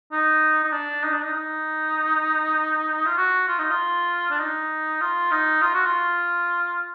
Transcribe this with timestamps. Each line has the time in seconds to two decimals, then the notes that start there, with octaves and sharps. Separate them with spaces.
0.12 D#4
0.63 D#4
0.72 D4
1.03 D#4
1.13 D4
1.22 D#4
1.33 D#4
3.06 F4
3.17 F#4
3.48 F4
3.59 D#4
3.70 F4
4.31 D4
4.39 D#4
5.01 F4
5.31 D#4
5.62 F4
5.74 F#4
5.86 F4